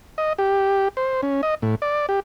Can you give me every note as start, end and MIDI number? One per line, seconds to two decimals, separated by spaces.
0.18 0.33 75
0.38 0.88 67
0.97 1.21 72
1.22 1.41 61
1.43 1.55 75
1.62 1.75 45
1.82 2.06 74
2.09 2.20 67